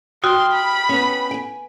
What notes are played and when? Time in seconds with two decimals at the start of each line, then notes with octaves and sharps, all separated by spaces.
0.24 F#4 G5 C6 D#6 F6
0.52 B5
0.89 B3 C#4
1.31 G5 G#5